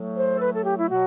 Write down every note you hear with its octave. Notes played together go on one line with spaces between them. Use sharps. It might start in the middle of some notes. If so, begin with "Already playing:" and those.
Already playing: A2 F#3 A3
C5
A4
B4
A4
G4
E4
B2 F#3 F#4